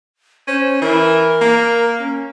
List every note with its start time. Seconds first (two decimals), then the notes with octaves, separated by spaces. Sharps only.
0.47 C#4 C5
0.82 E3 A#4
1.41 A#3
1.99 C#4